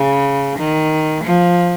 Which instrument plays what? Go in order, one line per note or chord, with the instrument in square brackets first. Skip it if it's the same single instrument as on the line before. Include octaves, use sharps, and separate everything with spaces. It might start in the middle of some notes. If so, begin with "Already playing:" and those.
Already playing: [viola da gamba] C#3
D#3
F3